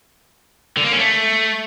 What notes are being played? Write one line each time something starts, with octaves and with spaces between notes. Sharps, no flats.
D3
A#3
C#4
A3